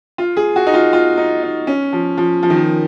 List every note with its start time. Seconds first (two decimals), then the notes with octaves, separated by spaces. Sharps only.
0.18 F4
0.37 G#4
0.56 F#4
0.67 D#4
0.74 F4
0.93 F4
1.18 D#4
1.43 D#4
1.67 C#4
1.93 F3
2.18 F3
2.43 F3
2.50 D#3
2.57 F3